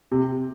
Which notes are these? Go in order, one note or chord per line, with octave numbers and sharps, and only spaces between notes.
C3